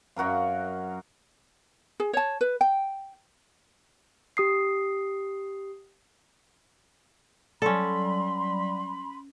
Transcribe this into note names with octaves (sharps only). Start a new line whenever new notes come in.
F#2 F#4 A#4 F5
G#4
C#5 A5
B4
G5
G4 D#6 C7
F#3 G3 C#4 A4 D5 B5 C6